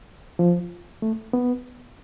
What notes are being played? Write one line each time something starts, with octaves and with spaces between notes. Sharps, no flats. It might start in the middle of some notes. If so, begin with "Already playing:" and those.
F3
A3
B3